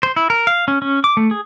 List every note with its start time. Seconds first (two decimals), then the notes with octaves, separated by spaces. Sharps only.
0.03 C5
0.16 E4
0.30 A#4
0.47 F5
0.68 C#4
0.82 C#4
1.04 D6
1.17 A3
1.31 G#4